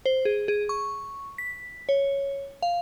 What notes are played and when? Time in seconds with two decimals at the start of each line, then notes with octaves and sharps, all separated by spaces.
0.06 C5
0.25 G#4
0.48 G#4
0.69 C#6
1.38 B6
1.89 C#5
2.62 F5